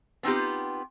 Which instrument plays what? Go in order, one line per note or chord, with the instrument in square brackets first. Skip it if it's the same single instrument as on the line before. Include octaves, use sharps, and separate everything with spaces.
[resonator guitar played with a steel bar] B3 C4 D#4 F4 G4